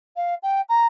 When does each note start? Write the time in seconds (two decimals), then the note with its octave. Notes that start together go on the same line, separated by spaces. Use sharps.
0.16 F5
0.43 G5
0.69 A#5